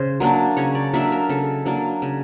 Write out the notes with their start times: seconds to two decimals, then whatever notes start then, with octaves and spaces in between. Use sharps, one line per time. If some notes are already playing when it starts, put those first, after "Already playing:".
Already playing: C#3 C5
0.20 F#3 A#3 D4
0.57 C#3 C#5
0.75 D5
0.93 F#3 A#3 D4 E5
1.12 A#4
1.29 C#3 A4
1.66 F#3 A#3 D4
2.02 C#3